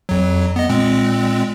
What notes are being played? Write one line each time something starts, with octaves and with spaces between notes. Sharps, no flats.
F2 F#3
B3 D#5
A#2 G#3 C4